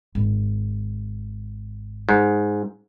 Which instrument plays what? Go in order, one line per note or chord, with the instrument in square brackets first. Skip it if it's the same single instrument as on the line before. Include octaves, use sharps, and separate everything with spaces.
[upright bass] G#1
[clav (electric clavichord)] G#2